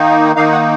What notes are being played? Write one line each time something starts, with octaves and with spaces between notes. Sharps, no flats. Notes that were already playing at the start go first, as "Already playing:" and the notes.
Already playing: D#3 A#3 D#4
D#3 A#3 D#4 F5
F#5